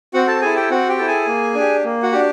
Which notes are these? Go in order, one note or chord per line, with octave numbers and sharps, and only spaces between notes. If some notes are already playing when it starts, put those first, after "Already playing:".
C4 F#4 F#5
A4 A5
E4 G#4 A4 G#5
G4 G5
C4 F#4 F#5
G4 G5
E4 A4
G#4 G#5
A#3
D4 G4
A#3
F#4 F#5
D4 G4